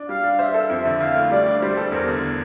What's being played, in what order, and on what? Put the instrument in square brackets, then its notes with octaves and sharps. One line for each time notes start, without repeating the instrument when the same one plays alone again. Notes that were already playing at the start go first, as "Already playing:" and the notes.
Already playing: [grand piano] D4
[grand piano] G3 [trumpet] F5
[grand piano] D4
[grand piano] C5 [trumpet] E5
[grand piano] A4
[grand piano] F2 [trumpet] E5
[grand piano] D3
[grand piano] E4 [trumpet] F5
[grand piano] A3
[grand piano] G3 [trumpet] D5
[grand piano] D4
[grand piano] G3 [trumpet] C5
[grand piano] A4
[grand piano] E2 [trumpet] A#4
[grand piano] D3